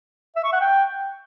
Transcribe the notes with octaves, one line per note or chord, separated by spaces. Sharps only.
E5
C#6
F#5
G5